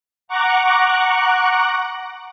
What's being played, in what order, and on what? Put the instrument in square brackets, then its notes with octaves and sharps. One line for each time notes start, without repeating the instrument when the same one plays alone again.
[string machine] F#5 A#5 C#6 D6 F#6